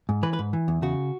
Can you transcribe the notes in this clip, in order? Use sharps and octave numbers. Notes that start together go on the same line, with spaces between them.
G#2
E3 B4
B4
G#2
E3
E2
C#3 F#4